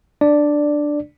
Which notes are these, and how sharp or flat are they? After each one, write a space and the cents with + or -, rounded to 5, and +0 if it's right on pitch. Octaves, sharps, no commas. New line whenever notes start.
D4 +10 D5 +0